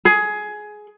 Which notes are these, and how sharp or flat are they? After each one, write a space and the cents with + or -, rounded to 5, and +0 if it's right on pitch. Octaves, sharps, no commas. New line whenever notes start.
G#4 +15